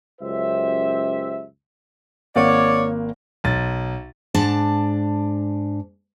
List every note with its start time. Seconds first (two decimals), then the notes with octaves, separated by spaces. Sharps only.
0.21 C#2 F#2 G4 C5 E5
2.36 G#1 A#3 C#5 D5 F#5
3.44 B1 A6
4.35 G#2 D4 A5